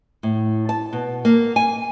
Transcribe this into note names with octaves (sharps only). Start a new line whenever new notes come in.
A2
A5
B2
A#3
G#5